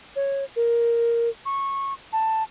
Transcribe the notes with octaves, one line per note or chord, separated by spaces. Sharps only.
C#5
A#4
C#6
A5